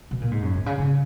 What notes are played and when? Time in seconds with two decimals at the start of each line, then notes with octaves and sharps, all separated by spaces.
0.11 B2
0.21 A#2
0.31 G#2
0.42 F#2
0.54 B2
0.66 C#3
0.78 C#3